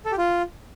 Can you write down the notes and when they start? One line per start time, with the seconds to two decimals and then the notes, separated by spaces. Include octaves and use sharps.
0.05 A4
0.12 G4
0.18 F4